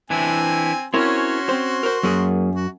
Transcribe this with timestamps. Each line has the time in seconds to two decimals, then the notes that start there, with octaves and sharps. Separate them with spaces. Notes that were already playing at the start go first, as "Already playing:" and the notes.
0.10 E3 C4 D4 E4 G#5
0.94 C4 C#4 E4 F#4 A#4 C#5 C6
1.49 C4 C5
1.83 A#4 C5
2.03 F#2 F#3 A#3 G#4
2.55 F#4